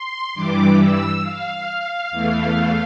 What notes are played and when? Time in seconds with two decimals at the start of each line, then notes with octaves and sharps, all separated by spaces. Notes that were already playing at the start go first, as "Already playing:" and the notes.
Already playing: C6
0.34 G2 E3 G3 D6
0.79 E6
1.23 F5
2.11 E2 E3 A3